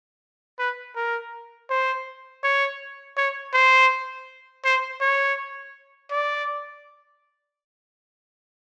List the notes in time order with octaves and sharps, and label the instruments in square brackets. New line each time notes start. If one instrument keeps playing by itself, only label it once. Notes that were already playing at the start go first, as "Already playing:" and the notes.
[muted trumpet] B4
A#4
C5
C#5
C#5
C5
C5
C#5
D5